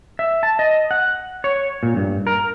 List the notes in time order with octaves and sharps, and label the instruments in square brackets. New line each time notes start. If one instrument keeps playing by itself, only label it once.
[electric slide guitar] E5
A5
D#5
F#5
C#5
A#2
G2
A#4